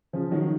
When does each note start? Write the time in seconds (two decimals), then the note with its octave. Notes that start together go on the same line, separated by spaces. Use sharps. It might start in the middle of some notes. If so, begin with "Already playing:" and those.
0.13 C#3 F3
0.31 D#3 F#3